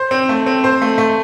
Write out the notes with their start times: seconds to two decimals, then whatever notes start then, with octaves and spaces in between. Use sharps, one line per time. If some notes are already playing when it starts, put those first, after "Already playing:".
Already playing: C5
0.11 C4
0.29 A3
0.46 C4
0.64 C5
0.82 A3
0.98 A3